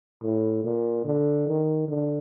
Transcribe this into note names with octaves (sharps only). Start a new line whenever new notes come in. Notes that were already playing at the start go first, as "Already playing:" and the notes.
A2
A#2
D3
D#3
D3